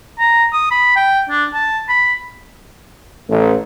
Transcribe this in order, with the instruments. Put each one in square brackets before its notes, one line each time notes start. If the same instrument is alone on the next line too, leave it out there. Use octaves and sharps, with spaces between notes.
[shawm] A#5
D#6
B5
G5
D4
A5
B5
[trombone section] A1